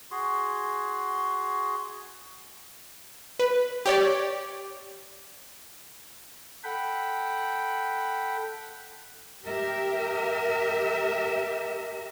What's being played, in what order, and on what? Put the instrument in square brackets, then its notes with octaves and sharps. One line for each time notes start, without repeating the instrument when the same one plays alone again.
[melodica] F#4 G#4 C6
[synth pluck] B4
G4 C#5 D5
[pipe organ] A4 F#5 G5 B5
[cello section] G4 A#4 E5